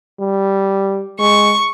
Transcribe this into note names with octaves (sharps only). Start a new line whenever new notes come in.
G3
G#3 C#6